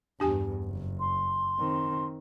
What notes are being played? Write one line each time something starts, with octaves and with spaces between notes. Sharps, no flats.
E2 G2 D4 G4 G#5
F#1
C6
D#3 C4